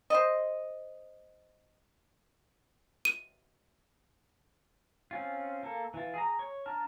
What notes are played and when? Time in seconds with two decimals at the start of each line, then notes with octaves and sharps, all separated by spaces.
0.10 C5 D#5
3.05 D#7
5.11 C4 C#4 F4
5.63 A#3 A4
5.94 E3 F4
6.14 G#4 A#5
6.39 C#5 C#6
6.66 D4 A5 A#5 F6